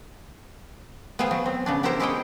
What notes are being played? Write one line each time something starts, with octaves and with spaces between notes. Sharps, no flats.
B3 G#4 C5 F5 G5
F#3
C4
C#3 B3 D4
B3 E4 G4 A#4 C5 A#5
G#3 E4 G4 G#4 C#5 G5